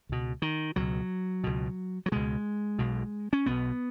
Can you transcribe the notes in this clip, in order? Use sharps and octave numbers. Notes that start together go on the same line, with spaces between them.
C#2 B2
D#3
C#2 B2 F#3
C#2 B2
F#3
C#2 B2 G#3
B1 B2
C#4
B1 B2 B3